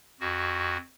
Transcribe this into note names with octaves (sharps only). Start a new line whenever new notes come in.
F2 F#4